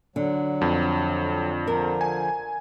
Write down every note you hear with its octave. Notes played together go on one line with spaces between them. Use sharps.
D3 F#3
F2
D3 F3 A#4
G#5